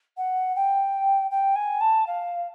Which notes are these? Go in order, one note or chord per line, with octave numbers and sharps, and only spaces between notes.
F#5
G5
G5
G#5
A5
F5